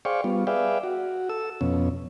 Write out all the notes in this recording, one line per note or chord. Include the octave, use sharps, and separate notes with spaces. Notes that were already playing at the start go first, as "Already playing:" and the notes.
G#4 C5 D5 F5 G5 C#6
G3 B3 F4
G#4 B4 D5 E5 F5 G5
F#4
A4 E6
F2 B2 C#4